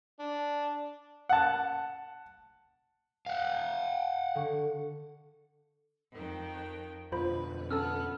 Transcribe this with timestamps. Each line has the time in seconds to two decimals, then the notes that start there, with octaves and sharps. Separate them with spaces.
0.20 D4
1.29 F#5 A5
3.26 F5 F#5
4.35 D3 C#6
6.12 F2 D#3 G5
7.12 F2 B2 D3 F4 B4 C5 B5
7.71 B3 C#4 A4 A5 E6 F6